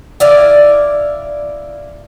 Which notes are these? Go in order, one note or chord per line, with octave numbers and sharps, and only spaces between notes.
E4 D5 F5